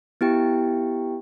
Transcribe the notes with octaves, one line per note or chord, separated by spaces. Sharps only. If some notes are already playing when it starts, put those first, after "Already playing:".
B3 E4 G4 G5